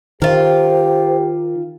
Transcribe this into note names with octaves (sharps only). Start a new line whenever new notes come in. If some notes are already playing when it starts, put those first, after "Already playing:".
D#3 F4 G4 A#4 C5